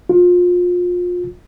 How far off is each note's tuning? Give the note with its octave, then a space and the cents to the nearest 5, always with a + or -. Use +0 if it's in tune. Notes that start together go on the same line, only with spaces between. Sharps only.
F4 +30